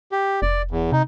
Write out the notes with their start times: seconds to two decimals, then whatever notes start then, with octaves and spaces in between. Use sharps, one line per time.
0.12 G4
0.42 F1 D5
0.71 E2
0.92 C3 D#4